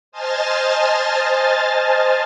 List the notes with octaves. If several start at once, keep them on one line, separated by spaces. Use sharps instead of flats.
C5 D#5 G#5 A5 F6 A6